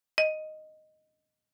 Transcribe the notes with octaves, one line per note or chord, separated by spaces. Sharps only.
D#5